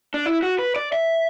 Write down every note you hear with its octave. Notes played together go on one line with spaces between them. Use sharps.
D4
E4
F#4
B4
D5
E5